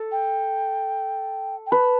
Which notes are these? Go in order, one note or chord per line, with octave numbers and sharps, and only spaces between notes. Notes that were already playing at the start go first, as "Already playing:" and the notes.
Already playing: A4
G5
G5
B4 A5